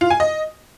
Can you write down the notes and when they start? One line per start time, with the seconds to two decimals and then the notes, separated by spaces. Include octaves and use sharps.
0.01 F4
0.10 G#5
0.20 D#5